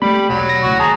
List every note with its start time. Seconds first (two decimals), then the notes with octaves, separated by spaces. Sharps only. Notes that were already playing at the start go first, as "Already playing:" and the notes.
0.02 G3 A3 B3 B5
0.29 E1 B1 F#3
0.49 A#6
0.63 C#2 A2 F#4
0.80 D#2 G#4 A5 A#5